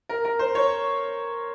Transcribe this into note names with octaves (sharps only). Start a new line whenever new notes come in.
A#4
A#4
C5
C#5